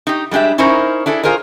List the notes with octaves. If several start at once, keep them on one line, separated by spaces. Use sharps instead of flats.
D#4 G4
G3 G#3 D4 G4 E5
C#4 D#4 E4 A#4 C5
D4 E4 G#4 A4
F4 G#4 A#4 C5 D#5